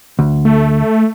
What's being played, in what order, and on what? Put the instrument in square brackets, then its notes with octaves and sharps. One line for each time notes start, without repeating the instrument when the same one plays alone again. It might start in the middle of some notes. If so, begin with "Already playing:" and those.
[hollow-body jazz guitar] D2
[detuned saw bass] A3